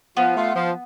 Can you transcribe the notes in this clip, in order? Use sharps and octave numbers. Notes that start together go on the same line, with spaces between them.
F3 B3
A3 F4
F3